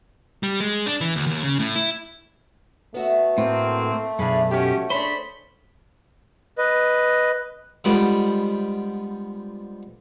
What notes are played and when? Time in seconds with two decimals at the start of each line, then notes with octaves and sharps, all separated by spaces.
0.43 G3
0.60 G#3
0.86 D4
1.01 E3
1.16 D2
1.27 D#2
1.43 C#3
1.59 A2
1.75 E4
2.94 A3 B3 F#4 E5
3.38 A2 A#3 C4
4.19 B1 F#2 D4 E4 G#4 F5 B5
4.51 G#2 C#4 F#4 G4
4.90 D4 G#4 C5 C#5 B5
6.58 B4 D#5
7.84 D3 F3 G3 G#3 B3 B4